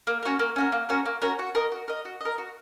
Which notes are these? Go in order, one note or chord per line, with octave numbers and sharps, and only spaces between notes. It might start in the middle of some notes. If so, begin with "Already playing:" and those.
A#3
C#4 F#4 A#4
A#3
C#4 F#4 A#4
A#3
C#4 F#4 A#4
A#3
C#4 F#4 A#4
F#4
A#4 D#5
F#4
A#4 D#5
F#4
A#4 D#5
F#4